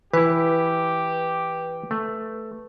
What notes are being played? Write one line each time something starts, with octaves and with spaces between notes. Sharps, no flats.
E3 E4 G4 B4
A3